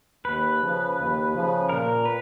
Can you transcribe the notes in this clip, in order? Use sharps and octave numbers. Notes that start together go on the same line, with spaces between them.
D#2 B4
C#3 F3
D#2
C#3 F3
A#2 A#4
B4